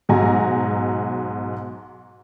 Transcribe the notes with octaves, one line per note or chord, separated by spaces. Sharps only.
B1 G#2 F#4 G#5 A#5